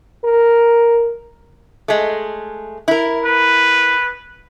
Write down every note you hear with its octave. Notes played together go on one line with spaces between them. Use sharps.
A#4
G#3 A3
E4 A#4
B4